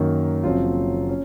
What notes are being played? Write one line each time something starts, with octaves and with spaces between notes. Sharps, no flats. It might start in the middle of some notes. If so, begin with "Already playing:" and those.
Already playing: F#2 D#3 A#3
F#1 F#2 F3 C4 F4
C#4